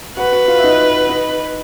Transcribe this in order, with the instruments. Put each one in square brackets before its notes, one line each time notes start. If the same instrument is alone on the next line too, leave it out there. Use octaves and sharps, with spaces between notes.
[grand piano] F#4 F#5 [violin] B4
[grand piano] F#4 F#5
F4 F5
E5
D#4 D#5
D#4 D#5